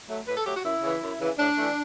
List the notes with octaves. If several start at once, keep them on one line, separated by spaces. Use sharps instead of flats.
F#3 A3
A2 B4
A4
F#3 A3 G4
F#4
F#2 E4
C#3 E3
F#2
C#3 E3
A2 D4
E3 A3